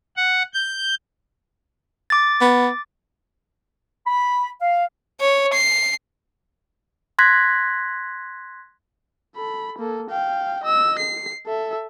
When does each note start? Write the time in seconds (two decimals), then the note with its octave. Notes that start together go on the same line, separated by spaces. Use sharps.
0.17 F#5
0.54 G6
2.10 D6 A6
2.41 B3
4.07 B5
4.62 F5
5.21 C#5
5.53 C7
7.19 C6 F#6 G#6 A#6 B6
9.35 A4 B5
9.79 A#3 A4
10.10 F5 G5
10.63 D#5 E6
10.98 C7
11.47 A4 E5